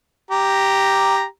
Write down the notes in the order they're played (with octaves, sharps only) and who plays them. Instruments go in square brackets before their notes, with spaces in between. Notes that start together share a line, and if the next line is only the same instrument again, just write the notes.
[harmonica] G4 A#5